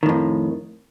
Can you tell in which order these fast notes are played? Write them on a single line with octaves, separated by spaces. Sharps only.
D#3 A2 F2